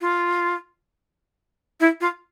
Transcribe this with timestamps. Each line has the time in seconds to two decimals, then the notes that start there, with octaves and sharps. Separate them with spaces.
0.01 F4
1.80 E4
2.01 F4